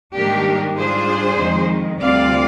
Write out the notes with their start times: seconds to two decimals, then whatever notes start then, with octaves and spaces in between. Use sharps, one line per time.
0.14 G#2 D#3 G3 A#3 D4 G4 A#4
0.76 G#2 G3 D4 F4 G#4 C5
1.38 F2 D#3 G#3
2.00 D2 C3 G3 C4 F4 D5 F5